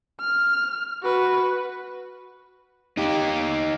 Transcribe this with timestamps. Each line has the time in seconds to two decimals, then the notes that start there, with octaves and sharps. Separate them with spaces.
0.21 F6
1.03 F#4 B4
2.97 D#4 G4